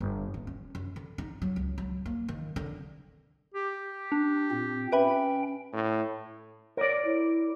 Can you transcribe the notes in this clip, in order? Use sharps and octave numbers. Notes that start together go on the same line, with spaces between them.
G1
D#1
C#4
F#2
D3
D#4
F#3
C#2
F#3
A#3
D#3
D3
G4
D4
A#2 C4
C#4 B4 E5 G5 B5
A2
A#4 C#5 D5
E4